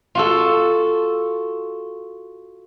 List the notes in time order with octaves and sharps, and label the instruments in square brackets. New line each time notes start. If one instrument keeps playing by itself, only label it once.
[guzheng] F4 F#4 A4